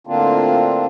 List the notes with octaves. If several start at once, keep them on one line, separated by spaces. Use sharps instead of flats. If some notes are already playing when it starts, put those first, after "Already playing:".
A2 D3 A#3 C4 D4 F4